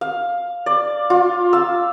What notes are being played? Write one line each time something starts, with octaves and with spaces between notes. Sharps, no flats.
F5
D5
F4
F5 E6